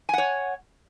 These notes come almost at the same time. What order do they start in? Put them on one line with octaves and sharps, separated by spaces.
G#5 F#5 C#5